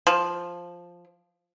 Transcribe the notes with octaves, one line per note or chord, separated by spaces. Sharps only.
F3